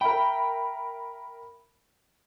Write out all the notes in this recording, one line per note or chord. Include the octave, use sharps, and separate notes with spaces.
A#4 E5 G5 B5